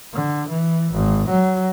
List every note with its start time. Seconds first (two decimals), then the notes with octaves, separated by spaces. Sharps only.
0.14 D3
0.49 E3
0.94 G#1
1.29 F#3